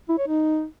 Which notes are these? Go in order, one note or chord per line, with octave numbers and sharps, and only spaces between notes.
E4
C#5
D#4